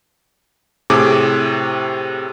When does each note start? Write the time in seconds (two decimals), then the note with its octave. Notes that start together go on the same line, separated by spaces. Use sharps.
0.90 A2 C3 G#4 D6